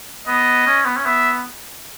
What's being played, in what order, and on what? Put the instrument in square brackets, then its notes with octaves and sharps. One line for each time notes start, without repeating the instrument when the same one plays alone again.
[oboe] B3 [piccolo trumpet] D#5
[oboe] C#4
B3
C#4
[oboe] B3 [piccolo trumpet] E5